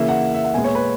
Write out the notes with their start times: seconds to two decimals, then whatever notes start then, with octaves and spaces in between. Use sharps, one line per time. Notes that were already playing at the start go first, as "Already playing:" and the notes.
Already playing: C#3 E3 A#3 E5
0.09 F#5
0.34 E5
0.44 F#5
0.54 A#2 G#3 B3 G#5
0.64 C#5
0.75 B4